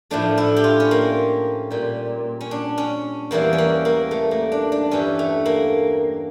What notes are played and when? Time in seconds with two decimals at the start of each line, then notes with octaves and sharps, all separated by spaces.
0.11 A2 F3 A3 D4
0.38 E4
0.56 G4
0.64 F4
0.80 C#4
0.91 A#3
1.71 A#2 G3
2.41 C#4
2.51 D4
2.78 C#4
3.31 E2 E3 G3 A#3
3.53 C#4
3.58 A#3
3.85 A#3
4.11 A3
4.31 A#3
4.52 D4
4.72 D4
4.91 G2 E3 G3 C#4
5.19 A3
5.46 A#3